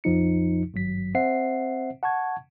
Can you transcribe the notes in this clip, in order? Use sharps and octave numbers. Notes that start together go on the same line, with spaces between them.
A#1 F2 F3 D#4 C#7
G#1 G2 F#3 B6
C4 C5 E5 F#5 C7
F#5 A5 C#6 G#6